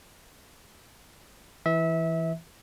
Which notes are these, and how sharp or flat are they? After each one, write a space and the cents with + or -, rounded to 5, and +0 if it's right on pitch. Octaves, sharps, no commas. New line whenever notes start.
E3 +0 E5 -25